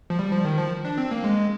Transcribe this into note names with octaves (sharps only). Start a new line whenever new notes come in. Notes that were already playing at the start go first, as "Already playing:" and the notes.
F3
G3
F3
D#3
F3
D4
C4
A#3
G#3